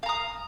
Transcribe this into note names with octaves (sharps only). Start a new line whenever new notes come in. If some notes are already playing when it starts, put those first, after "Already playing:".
F5 A#5 D#6